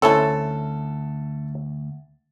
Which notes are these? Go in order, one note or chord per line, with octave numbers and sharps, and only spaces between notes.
D2 C4 C#4 E4 A4 A5